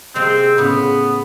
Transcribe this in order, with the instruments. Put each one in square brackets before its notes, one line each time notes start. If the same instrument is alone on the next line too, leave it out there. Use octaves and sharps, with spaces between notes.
[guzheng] C3 G#3 A#3 [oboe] C4
[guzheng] A2 C#3 [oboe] B3